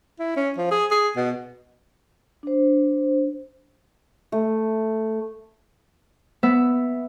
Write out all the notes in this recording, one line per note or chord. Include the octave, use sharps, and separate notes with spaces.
E4
C#4
F3
G#4
G#4
B2
D4 C5
A3
B3 E5